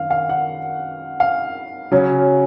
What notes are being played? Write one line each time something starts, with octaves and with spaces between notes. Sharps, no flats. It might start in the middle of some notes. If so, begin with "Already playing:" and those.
Already playing: F#2 D#3 F5
F5
F#5
F5
C#3 F#3 C#4